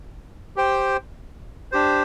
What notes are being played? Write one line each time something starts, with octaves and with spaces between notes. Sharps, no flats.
G4 C5 G5
D4 G4 C5